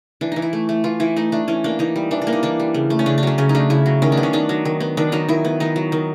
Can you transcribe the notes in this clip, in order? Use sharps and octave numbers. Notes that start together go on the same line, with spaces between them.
E3 D4
E3 D#4
E4
A3
A3
E3 F4
E3 E4
A3 D#4
A3 D4
E3 C#4
A#3 D4
E3 D#4
G3
E3 D4
D4
A#3
D#4
E3 D4
G3
C#3
A3
C#4
C#3 D4
D4
F#3 C#4
C#3 C#4
D#4
A3 D4
C#3 E4
F#3
D#3 C#4
D4
B3
C#4
D#3 D4
F#3
D#3
B3
D#3 D4
F#3 D#4
D#3 E4
B3
D#3 D#4
F#3
D#3